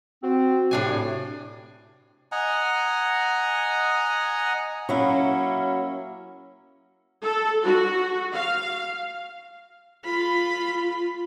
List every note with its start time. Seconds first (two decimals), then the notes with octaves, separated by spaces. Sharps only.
0.23 C4 F#4
0.71 A2 C3 D4 G#5
2.32 D#5 F#5 G#5 A#5
4.89 F#3 A#3 C#4 E4
7.23 A4
7.63 F#4
8.33 F5
10.04 F4 B5